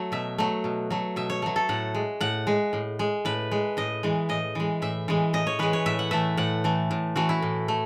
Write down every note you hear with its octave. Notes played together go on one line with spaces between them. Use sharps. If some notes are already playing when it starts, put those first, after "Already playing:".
Already playing: F#3 A3
B2 E5
F#3 A3
B2
F#3 A3
B2 E5
C#5
F#3 A3
A4
A2 F#5
G#3
A2 F#5
G#3
A2
G#3
A2 B4
G#3
A2 D#5
E3 G#3
A2 D#5
E3 G#3
A2 E5
E3 G#3
A2 D#5
C#5
E3 G#3 B4
C#5
A2 E5
F#5
E3 A3 E5
A2 F#5
E3 A3
A2
E3 A3 F#4
E4
A2
A3